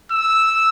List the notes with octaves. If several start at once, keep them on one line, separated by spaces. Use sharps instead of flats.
E6